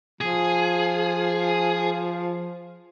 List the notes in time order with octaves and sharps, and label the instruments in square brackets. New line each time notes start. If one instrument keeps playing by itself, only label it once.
[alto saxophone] F3 [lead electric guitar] G#4